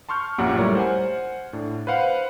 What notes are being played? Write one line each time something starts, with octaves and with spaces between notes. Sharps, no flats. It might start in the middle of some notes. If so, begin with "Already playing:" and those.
A5 C6 C#6 F6 G6
A#1 F#2 A#2 G4 F#5
G3 A3 E4 A#4 C#5 D5
C5 F#5 G#5
A2 D4
B4 C5 F5 F#5